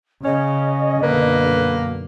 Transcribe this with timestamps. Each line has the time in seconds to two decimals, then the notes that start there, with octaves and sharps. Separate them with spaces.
0.25 C#3 C#4 D#5
1.02 B1 F#2 D3 A#3 B4